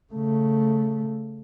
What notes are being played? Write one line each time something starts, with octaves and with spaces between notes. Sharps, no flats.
C#3 A3